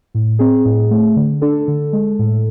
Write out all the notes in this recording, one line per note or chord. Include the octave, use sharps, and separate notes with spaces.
A2
C4 G#4
A2
A3
D3
D4 A4
D3
G#3
A2